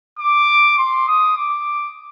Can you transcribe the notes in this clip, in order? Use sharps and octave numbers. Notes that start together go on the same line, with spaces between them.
D6
C6
D#6
D6